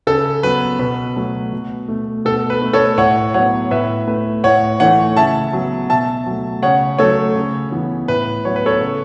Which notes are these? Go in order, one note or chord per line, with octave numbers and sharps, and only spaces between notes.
C#3 A4
F#3 B3 B4
B2 B4
F#3 A3
B2
A3
B2 A4
B4
A3
A4 C#5
A2 C#5 F#5
F#3 B3 C#5 F#5
A2 B4 E5
A3 B4
A2 C#5 F#5
E3 A3 C#5 F#5
C#3 E5 A5
F#3 B3
B2 E5 A5
F#3 A3
C#3 C#5 F#5
F#3 A3 A4 C#5
C#3
E3 B3
A2 B4
F#3 B3 C#5
B4
A4 C#5
C#3